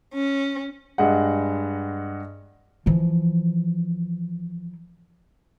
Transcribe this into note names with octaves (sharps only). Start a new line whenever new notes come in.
C#4
G2 G#3 D#5 F#5
E3 F3